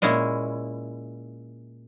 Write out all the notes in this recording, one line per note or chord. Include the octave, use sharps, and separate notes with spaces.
A#2 G#3 C#4 E4